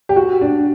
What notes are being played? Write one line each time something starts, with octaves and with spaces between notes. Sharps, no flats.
G4
F#4
D4